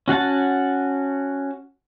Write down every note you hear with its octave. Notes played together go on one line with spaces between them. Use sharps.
C#4 F#4 F#5 A5